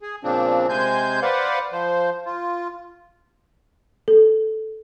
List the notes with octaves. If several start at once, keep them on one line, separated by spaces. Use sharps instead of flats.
G#4
A#2 C#3 F3 C4 D4
C3 G#3 C5 G#5 G6
B4 C5 D5 F5 F#5
F3 C5
F4
A4